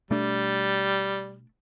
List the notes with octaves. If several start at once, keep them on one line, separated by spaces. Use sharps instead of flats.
B2 G3 A3 D4